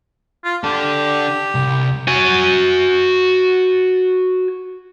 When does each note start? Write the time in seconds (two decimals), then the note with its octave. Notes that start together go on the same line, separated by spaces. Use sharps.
0.44 F4
0.64 D4 G4 A4
1.55 C2
2.08 F#4 G#5